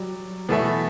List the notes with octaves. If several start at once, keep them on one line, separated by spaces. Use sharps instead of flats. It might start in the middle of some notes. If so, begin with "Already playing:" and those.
Already playing: F#3 G3 D5
B2 E3 A3 E4 A4 E5